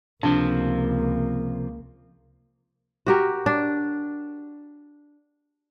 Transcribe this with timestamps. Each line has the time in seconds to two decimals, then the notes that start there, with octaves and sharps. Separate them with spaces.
0.23 C#2 C3 F3 A#3 D4
3.07 F#4 G4 A#4
3.46 D4